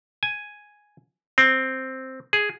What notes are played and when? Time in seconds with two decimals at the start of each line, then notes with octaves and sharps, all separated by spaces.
0.23 G#5
1.38 C4
2.33 G#4